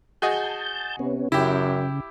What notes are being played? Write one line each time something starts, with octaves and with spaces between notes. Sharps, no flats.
F#4 G#4 D#5 A5 G6
C3 B3 C#4
F#2 C#3 E4 G4